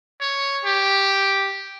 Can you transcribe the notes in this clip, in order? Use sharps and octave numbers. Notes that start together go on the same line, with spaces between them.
C#5
G4